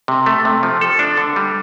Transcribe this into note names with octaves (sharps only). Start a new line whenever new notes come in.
C3
A3
C3
F3
A4
D4
D3
G3